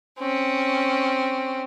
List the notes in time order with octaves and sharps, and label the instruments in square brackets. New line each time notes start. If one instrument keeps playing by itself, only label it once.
[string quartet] C4 C#4